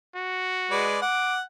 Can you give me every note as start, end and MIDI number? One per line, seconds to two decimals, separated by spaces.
0.16 0.89 66
0.71 0.99 56
0.71 0.99 71
0.71 0.99 74
1.02 1.41 78
1.02 1.38 86